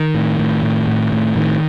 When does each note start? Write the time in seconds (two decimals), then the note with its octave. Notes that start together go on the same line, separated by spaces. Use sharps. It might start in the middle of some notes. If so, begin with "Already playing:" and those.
Already playing: D#3
0.15 A2
0.39 A2
0.63 A2
0.87 A2
1.12 A2
1.36 A2 D#3